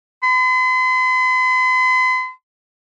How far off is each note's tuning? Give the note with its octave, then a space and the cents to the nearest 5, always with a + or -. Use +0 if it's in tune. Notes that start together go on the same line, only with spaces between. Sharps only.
C6 -45